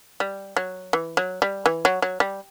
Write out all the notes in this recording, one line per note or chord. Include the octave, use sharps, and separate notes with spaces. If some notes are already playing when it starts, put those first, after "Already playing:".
G3
F#3
E3
F#3
G3
E3
F#3
F#3
G3